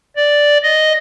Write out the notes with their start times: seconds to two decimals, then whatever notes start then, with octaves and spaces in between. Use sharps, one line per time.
0.16 D5
0.63 D#5